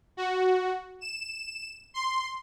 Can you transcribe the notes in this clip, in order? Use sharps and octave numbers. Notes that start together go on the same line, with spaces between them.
F#4
E7
C6